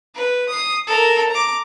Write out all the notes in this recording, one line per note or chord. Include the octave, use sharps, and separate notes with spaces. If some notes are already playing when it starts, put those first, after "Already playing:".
B4
D#6 C7
A4 A#4
A#5 D6